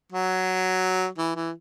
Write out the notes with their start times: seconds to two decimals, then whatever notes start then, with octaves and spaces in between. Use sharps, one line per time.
0.12 F#3
1.18 E3
1.35 E3